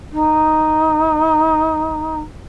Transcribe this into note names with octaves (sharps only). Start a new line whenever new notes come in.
D#4